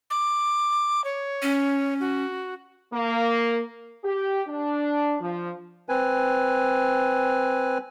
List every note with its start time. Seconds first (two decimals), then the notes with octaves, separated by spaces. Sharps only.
0.10 D6
1.04 C#5
1.42 C#4
2.00 F#4
2.93 A#3
4.04 G4
4.48 D4
5.20 F3
5.89 C4 B4 G#5